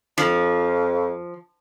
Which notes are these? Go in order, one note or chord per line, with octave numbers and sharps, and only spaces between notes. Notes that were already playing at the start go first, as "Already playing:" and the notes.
F2 F3